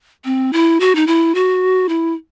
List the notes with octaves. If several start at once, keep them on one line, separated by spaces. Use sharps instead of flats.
C4
E4
F#4
D#4
E4
F#4
E4